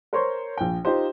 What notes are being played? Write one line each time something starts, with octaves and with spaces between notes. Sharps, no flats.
A#4 C5 C#5 C6 C#6
A#1 G5
D#4 F4 G4 C5